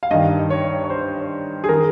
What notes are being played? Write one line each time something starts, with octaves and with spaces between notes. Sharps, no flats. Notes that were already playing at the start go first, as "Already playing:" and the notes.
F5
G2 D#3 D#5
C#5
C#5
C5
G#4
D#3 A#4